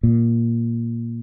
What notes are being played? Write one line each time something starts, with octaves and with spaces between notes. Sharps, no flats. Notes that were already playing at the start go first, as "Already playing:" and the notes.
A#2